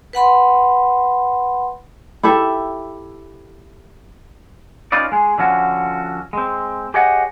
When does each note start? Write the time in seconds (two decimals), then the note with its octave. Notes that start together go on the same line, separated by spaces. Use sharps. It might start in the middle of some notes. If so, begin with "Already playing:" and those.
0.13 B4 F#5 B5 C6
2.23 E4 G4 A4 E5
4.92 C#4 D#4 F4 B4 D5
5.12 G#3 G#4
5.38 D3 F3 C#4 F#4
6.33 G#3 C4
6.94 G4 G#4 C#5 D#5 F#5